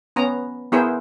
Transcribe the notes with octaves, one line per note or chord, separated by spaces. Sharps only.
B3 C#4 A#5
B3 E4 G#4 A#4 C5